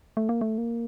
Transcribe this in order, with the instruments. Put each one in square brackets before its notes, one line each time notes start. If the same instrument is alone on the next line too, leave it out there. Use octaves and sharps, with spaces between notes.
[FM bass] A3
A#3
A3
A#3